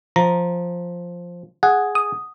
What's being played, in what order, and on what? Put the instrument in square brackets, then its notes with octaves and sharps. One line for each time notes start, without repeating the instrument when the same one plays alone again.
[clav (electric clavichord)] F3 [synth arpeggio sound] A#5
[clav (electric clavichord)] G#4 [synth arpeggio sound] F#5
[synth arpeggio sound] D#6